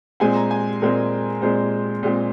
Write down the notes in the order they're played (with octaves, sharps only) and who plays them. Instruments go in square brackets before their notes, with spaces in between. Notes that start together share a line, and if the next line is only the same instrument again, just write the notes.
[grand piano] A#2 G#3 C4 G#5
A#5
G#5
A#2 G#3 C4 A#4
A#2 G#3 C4 C5
A#2 G#3 C4